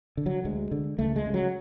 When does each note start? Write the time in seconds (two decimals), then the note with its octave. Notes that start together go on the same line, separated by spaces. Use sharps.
0.17 D3
0.26 F#3
0.45 D2 G#3
0.71 D3
0.99 C#2 A3
1.16 G#3
1.26 C#3
1.34 F#3